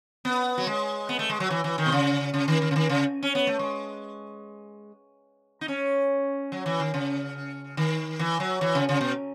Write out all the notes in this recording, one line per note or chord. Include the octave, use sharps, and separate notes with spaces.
B3
F#3
G#3
B3
A3
G#3
F#3
E3
E3
D#3
B2
C#3
C#3
D#3
D#3
C#3
D#3
C#3
C#4
B3
A3
G#3
D#4
C#4
F#3
E3
D#3
C#3
D#3
E3
F#3
E3
C#3
C#3
B2